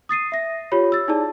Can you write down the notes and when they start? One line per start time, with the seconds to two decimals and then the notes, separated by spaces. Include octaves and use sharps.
0.09 D#6 A6 C7 D#7
0.32 E5 A#6
0.72 F4 G4 C#5 B5
0.92 E6 A6
1.08 D#4 E4 G#4 D5 A5